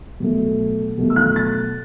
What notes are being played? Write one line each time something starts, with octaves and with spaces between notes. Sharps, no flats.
B2 F#3 A3
B2 F#3 A3
E6
F#6
A6